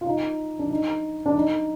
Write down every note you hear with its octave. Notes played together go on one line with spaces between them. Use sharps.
F4
D#4
D4
D#4
D4
D#4